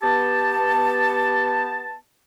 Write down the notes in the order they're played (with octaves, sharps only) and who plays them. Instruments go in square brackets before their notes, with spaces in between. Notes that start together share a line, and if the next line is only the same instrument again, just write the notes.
[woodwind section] B3 G4 A5